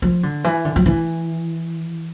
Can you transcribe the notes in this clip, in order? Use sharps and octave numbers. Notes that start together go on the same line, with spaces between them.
F3
D3
E3
D3
F3
E3